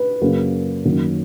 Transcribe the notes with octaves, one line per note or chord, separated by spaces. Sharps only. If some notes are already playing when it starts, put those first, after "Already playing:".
Already playing: B4
F#2 C#3 F#3 A#3
F#2 D#3 F#3 A#3